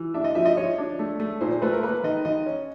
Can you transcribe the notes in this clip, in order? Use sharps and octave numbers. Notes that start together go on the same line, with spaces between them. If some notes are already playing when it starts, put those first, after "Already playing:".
Already playing: E3
D4 E5
D#5
F3 E5
D#5
F3 C#5
D4
A3
A3
A#2 C5
C5
A3 B4
A#4
A#3 B4
D#3 D#5
D#3 D#5
C#4